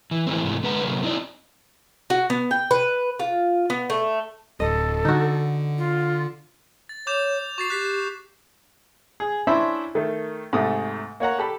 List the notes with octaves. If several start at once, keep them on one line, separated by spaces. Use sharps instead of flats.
E3
E3 A3 C4
G#2 C3 E3 A3
D3 G#3 B4 F#5 A#5
C3 F#3 A3 A#3
C4 D#4 E4 D5
F#4
B3
G5
B4
F4
B3
A3
D1 A4 D#5
D3 D#4 F#4
F4
A6
C#5 D6 G6 E7
F#4 C#6 A6 C7
G4 F#6 B6 C7
G#4
C#4 D4 E4 C5 E5 B5
D#3 A3
G#2 C3 A3 D#6
A#3 C#5 F#5 A#5
G4 A4 B5